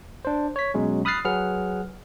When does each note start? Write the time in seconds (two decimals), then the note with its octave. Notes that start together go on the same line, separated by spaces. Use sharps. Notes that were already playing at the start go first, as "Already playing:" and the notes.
0.25 D4 C5
0.56 C#5 B6
0.74 B2 F#3 G#3 C#4
1.05 B5 D#6 F6 F#6 A6 C7
1.25 F#3 G#4 B4 F#5 F6